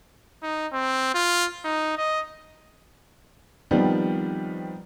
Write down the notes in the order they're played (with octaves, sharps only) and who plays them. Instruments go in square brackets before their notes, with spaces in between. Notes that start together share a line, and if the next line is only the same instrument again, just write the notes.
[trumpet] D#4
C4
F4
D#4
D#5
[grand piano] D#3 F3 G3 B3 C4